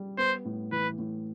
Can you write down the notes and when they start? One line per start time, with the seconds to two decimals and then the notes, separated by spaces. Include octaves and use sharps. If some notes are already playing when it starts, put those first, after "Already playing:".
Already playing: G3
0.18 B3 C5
0.45 A2
0.72 E3 B4
0.99 A2